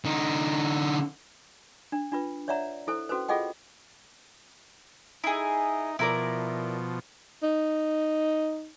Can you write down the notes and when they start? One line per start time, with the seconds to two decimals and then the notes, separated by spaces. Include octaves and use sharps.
0.05 D3 D#4
1.92 D4
2.12 D4 F4 B4
2.48 C#5 D5 E5 F#5 A#5
2.87 E4 A4 C5
3.09 C#4 F#4 A4 B4 C5
3.28 F4 G#4 A4 D#5 F#5 G5
5.24 D#4 E4 G#4
5.99 B2 F3 E4 A#4 D5
7.43 D#4